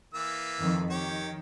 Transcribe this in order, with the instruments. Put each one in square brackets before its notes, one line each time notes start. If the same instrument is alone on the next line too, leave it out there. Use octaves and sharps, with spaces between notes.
[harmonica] E3 A#3 E6
[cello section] F2 D#3
[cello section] D#3 [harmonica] G4 C#5